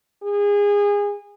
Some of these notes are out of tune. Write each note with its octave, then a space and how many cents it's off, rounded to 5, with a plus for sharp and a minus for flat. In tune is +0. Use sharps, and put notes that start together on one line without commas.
G#4 -25